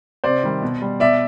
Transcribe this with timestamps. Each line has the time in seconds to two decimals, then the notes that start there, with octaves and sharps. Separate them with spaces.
0.24 C3 C5 D5
0.43 D#3 G3
0.62 B2
0.82 G3
1.00 B2 D5 E5